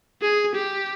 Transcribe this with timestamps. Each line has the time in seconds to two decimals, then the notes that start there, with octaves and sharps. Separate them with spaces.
0.22 G#4
0.55 G4